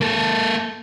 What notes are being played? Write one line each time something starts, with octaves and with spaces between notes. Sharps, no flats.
A#3 A4